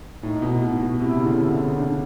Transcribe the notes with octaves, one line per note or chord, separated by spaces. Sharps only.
A2 D#4
B2
B2
B2
C3 E4
C#3
D3
D3
C#3
D4